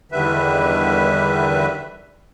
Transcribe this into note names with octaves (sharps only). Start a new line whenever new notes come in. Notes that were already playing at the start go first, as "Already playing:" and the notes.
E2 D3 D#3 G3 B4 E5